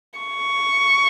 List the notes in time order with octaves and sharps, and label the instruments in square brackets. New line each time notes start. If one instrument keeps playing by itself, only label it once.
[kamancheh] C#6